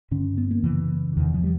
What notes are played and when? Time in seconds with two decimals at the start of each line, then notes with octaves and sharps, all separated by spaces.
0.11 G2 D3 C#4
0.38 B3
0.51 A#3
0.64 F#2 C#3 E3
1.17 E2 C3 D#3
1.34 F3
1.44 G3